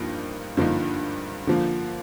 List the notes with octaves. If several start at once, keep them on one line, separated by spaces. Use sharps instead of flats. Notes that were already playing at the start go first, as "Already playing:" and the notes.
Already playing: G2 F3 A#3 D#4
G2 D3 F3 A#3 D#4
D3 F3 A#3